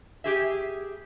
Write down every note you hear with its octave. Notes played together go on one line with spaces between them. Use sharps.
G4 G#4 E5